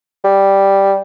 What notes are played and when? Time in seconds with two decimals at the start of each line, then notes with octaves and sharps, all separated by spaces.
0.24 G3